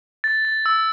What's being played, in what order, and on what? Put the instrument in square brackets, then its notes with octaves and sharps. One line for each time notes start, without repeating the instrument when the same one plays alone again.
[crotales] A6
A6
E6